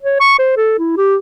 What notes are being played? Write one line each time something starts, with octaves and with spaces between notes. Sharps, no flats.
C#5
C#6
C5
A4
E4
G4